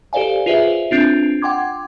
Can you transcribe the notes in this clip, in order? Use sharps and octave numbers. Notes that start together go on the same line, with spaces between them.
G4 A4 C5 D5 F5 G#5
F4 G#4 B4 C5 E5
C4 D4 F4
F#5 G5 C6 D6 G#6